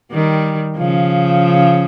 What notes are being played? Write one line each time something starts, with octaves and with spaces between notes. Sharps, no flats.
D#3 G3
C#3 F3